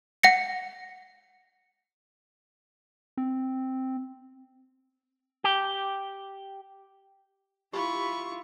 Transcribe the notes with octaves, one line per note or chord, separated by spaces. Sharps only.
F#5 A#6 C#7
C4
G4
E4 F4 G4 B5 C#6